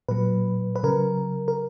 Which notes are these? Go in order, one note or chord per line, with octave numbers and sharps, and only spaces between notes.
A#2 F#3 B4
B4
C#3 F#3 A#4
A#4